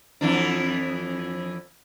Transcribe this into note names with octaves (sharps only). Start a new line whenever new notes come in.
F2 E3 D4